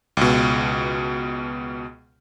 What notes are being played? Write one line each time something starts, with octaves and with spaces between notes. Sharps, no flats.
C#2 B2